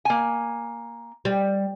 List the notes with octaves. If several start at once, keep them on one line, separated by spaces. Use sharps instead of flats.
A#3 G#5
G3